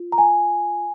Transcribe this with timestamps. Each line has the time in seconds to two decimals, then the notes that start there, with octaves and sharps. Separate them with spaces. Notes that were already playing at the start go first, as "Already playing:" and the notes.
Already playing: F4
0.12 A#5
0.18 G#5